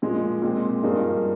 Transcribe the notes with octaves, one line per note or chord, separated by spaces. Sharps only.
A#2 F3 G#3
A#2 G#3 C4
G2 F3 A#3 D#4 G#4